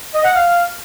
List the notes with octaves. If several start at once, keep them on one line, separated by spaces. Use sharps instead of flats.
D#5
F#5
F5